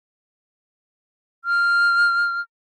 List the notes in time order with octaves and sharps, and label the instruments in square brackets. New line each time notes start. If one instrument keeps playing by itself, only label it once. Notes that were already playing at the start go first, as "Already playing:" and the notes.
[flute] F6